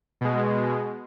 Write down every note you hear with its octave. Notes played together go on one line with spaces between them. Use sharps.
B2 G#3